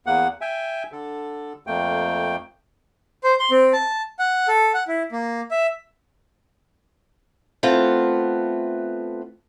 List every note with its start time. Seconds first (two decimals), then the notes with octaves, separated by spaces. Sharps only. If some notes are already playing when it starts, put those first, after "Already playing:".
0.06 E2 A#3 F#5
0.41 E5 G5 G#5
0.92 D3 A4
1.67 F2 A3 A#3 G5
3.23 C5
3.40 C6
3.51 C4
3.73 A5
4.19 F#5
4.48 A4
4.74 F#5
4.88 E4
5.12 A#3
5.51 E5
7.63 A3 B3 C4 F4